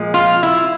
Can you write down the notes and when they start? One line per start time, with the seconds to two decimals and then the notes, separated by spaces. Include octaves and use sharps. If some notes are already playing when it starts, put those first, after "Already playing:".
Already playing: A#2 F3 G#3
0.14 F4
0.43 E4